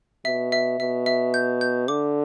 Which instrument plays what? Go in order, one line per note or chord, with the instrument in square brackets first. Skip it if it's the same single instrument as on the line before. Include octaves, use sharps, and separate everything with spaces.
[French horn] B2 [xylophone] E5
[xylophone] E5
[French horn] B2 [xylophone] E5
[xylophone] E5
G6
G6
[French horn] D3 [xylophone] D6